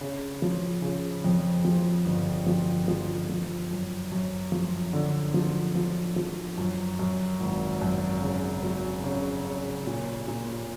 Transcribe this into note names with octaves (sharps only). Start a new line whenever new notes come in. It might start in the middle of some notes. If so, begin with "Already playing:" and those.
C#3
F3
C#3
F2
F3
G1
F3
F3
F3
F#2
F#2
F3
D3
F3
F3
F3
F#2
F#2
G#1
F#2
C#3
F#3
C#3
C#3
A#2
A#2